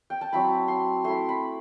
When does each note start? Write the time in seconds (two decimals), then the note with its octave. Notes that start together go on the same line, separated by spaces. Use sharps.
0.10 G5
0.21 A5
0.33 F#3 C4 E4 B5
0.68 C6
1.04 A3 E4 C6
1.29 B5